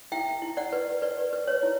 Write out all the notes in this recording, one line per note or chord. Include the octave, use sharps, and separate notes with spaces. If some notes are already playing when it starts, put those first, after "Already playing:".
E4 E5 G5
E4
D5 F#5
B4
B4 D5
B4
C#5
E4